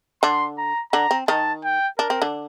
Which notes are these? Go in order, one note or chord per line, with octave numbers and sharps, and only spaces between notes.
D3 D4 C6
A#5
D3 D4 A#5
C4
D#3 D#4 A5
G5
D4 A#4
C4
D3 D4